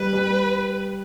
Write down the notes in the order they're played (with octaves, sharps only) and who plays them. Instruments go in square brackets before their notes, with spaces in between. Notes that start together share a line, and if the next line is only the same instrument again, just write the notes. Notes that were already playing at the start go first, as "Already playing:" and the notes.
Already playing: [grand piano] G3 [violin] B4
[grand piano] G3